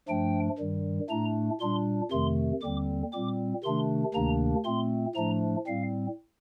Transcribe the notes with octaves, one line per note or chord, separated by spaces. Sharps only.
G2 F3 A3 D4 G5
G2 D#3 G3
A2 A3 D4 A#5
A#2 G3 D4 C6
F2 C3 D#3 A3 C6
D#2 D3 G3 C4 D6
A#2 G3 C4 D6
C3 D#3 A3 D4 C6
D2 C3 D#3 A#3 D4 A#5
A#2 A3 C4 C6
A2 F3 A3 D4 A#5
A2 G3 C4 F5